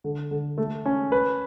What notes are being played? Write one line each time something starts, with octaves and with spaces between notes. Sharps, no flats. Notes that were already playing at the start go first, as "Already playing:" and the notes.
D3
D3
A3
C#4
B4